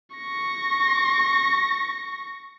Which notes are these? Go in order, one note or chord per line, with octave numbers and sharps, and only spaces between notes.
C#6 A#6